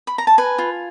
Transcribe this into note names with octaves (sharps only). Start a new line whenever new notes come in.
B5
A#5
A5
B4 G#5
F4